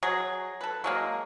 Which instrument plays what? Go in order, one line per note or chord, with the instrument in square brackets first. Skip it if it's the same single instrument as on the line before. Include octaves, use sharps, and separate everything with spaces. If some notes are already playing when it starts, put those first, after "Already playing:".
[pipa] F#3 G#4
A4 B4
F#3 G#3 A#3